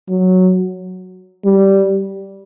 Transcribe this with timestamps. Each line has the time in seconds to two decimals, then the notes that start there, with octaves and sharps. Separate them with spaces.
0.09 F#3
1.45 G3